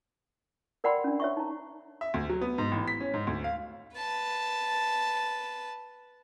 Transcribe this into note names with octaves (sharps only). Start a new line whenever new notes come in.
A#4 D5 F#5 G5 B5 C6
C#4 D4
C#5 E5 C#6
D#4 A#5
E5
D2
F#3
B3
G#2
A1
B6
C#4
G#2
D2
F5
B4 A5